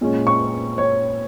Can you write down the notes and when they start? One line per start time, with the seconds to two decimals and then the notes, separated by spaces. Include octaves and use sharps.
0.01 A#2 G#3 C#4
0.27 C#6
0.78 C#5